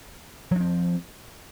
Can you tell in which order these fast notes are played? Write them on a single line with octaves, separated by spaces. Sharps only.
F3 D4 C4